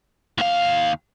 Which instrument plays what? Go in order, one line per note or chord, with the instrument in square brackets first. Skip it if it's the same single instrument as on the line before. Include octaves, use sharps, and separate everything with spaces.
[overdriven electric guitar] D#2 F5